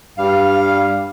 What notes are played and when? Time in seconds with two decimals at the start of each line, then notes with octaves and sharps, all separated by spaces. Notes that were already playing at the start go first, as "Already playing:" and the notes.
0.18 G2 G3 F5